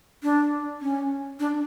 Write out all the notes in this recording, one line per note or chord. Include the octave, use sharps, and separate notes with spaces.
D4
C#4
D4